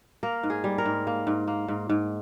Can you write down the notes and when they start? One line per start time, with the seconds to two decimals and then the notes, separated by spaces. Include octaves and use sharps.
0.23 A#3 A#4
0.43 G#2
0.50 G#4
0.64 G3
0.78 A#4
0.85 G#2
1.07 A#3
1.27 G#2
1.48 A#3
1.68 G#2
1.89 G#2